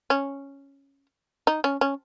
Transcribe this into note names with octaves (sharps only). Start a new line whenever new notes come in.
C#4
D#4
C#4
C#4